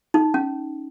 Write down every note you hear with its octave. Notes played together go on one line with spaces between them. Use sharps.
D#4
C#4